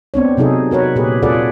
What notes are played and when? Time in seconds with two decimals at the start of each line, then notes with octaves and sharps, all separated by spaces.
0.14 B3 C4 D4 C#5
0.37 C3 F#3 D#4 G#4 A4
0.71 F#4 A#4 B4 C#5
0.96 A#2 G4 G#4 B4
1.22 F4 G#4 A4 B4 D5 F#5